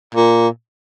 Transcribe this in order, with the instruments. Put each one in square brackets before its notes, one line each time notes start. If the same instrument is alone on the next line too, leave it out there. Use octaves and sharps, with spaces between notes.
[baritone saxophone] A#2